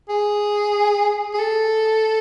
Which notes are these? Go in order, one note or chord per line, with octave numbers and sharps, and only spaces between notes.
G#4
G#4
A4